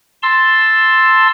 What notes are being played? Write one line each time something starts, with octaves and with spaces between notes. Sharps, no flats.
A5 C6 E6